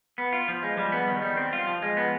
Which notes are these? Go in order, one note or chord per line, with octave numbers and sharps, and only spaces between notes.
B3
F4
F3
G#3
G3
B3
D#3
G3
C4
F4
F3
G#3
B3